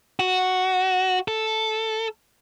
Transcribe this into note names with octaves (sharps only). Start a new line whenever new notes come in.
F#4
A4